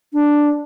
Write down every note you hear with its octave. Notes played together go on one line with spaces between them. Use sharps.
D4